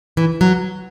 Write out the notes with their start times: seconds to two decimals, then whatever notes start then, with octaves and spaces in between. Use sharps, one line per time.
0.17 E3
0.41 F#3